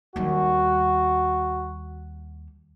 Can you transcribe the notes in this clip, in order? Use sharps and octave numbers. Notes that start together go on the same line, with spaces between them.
D#2 G3 F#4